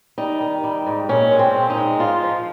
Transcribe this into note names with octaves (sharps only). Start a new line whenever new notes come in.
G3 D#4
D#3
G3
G#2
A#2 C#4
G#3
C4
A#2
D#4
G#3
G#2 F4
F3